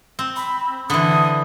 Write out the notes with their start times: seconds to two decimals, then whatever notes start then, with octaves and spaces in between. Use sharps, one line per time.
0.19 C4
0.37 B5
0.90 D3 E3 D#6